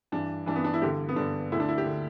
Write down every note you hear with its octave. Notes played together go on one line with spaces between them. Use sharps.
G2 E3 D4
G2 E3 D4
B3
D4
E4
G2 D3 G4
B3
G2 D3 D4
D2 D3 E4
D4
E4
G4
D3